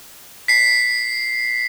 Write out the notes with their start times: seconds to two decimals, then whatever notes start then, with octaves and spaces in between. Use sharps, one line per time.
0.48 B6 C7